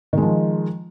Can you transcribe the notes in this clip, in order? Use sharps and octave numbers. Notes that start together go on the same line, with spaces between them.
D#3 F3 G#3